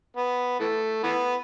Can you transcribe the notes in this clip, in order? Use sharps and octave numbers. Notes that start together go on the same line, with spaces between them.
B3
E3 A3
E3 B3